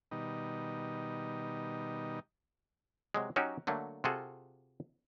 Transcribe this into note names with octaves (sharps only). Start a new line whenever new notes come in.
B2 D#3 G3 D#4
C3 F#3 G#3
F#3 C#4 D#4 F#4 G4
D3 F#3 A3 A#3
C3 F4 F#4 G#4 A4